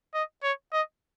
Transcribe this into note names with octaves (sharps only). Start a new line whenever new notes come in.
D#5
C#5
D#5